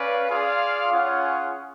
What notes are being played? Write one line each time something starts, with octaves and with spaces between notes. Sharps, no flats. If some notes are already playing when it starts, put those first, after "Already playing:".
Already playing: C#4 B4 D5 F5
F4 G#4 D5 F5
C#4 F4 G#4 C#5 F#5